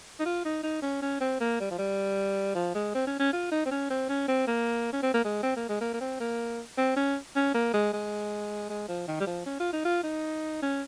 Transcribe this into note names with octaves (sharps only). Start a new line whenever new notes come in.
D#4
F4
D#4
D#4
C#4
C#4
C4
A#3
G3
F3
G3
F3
G#3
C4
C#4
C#4
F4
D#4
C4
C#4
C4
C#4
C4
A#3
C#4
C4
A#3
G#3
C4
A#3
G#3
A#3
A#3
C4
A#3
C4
C#4
C#4
A#3
G#3
G#3
G#3
F3
D#3
G3
F3
C#4
F4
D#4
F4
D#4
C#4